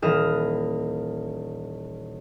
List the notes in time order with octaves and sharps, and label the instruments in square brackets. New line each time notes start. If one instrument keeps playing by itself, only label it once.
[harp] D#1 E3 D#5 F5 E7